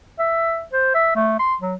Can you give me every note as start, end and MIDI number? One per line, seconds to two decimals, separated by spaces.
0.19 0.63 76
0.73 0.93 72
0.95 1.12 76
1.16 1.37 57
1.39 1.55 84
1.61 1.75 54